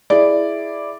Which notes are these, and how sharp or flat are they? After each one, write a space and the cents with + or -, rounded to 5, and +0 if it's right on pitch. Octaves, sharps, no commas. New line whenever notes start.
E4 +0 G#4 +0 D5 +0